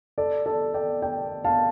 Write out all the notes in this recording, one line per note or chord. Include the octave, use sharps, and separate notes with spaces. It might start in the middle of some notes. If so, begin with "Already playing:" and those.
A4 D5
A4 D5
D5 G5
D5 G5
F5 A5